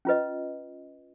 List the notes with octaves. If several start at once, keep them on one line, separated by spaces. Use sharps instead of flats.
C#4 F4 B4 D#5